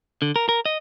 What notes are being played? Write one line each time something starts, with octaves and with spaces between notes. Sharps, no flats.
D3
A#4
A#4
D#5